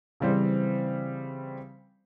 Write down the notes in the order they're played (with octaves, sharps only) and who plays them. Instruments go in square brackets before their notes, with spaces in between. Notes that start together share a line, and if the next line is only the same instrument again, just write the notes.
[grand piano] C#3 E3 G3 C4 C5